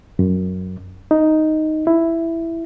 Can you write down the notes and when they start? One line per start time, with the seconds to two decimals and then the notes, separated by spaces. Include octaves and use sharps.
0.19 F#2
1.11 D#4
1.87 E4